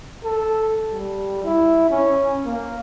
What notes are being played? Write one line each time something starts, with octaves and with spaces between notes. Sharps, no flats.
A4
G3
E4
C#4
A#3